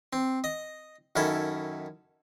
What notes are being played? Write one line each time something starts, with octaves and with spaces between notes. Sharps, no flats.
C4
D#5
F#2 D#3 C#4 E4 A4